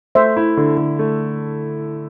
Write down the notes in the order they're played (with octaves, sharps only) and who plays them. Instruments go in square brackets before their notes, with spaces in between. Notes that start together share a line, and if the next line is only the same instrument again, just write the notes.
[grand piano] A3 [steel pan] C5 E5
[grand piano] E4
D3
D3
A3